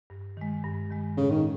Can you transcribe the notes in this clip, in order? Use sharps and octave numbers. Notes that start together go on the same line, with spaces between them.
G2
D#3 G#3
G2
D#3 G#3
A2 C#3
D#3